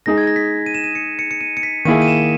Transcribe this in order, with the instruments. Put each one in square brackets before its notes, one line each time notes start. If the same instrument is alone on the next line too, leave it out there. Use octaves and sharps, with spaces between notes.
[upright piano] G#3 D#4 G#4 [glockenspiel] A#6
[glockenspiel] G#6
A#6
B6
D#7
E7
D#7
C#7
C#7
C#7
D#7
C#7
B6
[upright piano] D#3 A#3 E4 G#4 [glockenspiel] D#7
[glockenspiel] D#7
E7